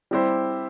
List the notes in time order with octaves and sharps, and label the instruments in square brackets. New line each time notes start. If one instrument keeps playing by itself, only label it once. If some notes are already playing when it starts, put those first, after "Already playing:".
[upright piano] G3 C4 E4 G4 C5